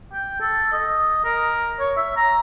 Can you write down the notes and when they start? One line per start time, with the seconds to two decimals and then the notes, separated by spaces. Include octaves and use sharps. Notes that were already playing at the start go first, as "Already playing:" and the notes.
0.13 G5
0.40 A4
0.72 D#5
1.24 A#4
1.79 C#5
1.96 E5
2.17 A#5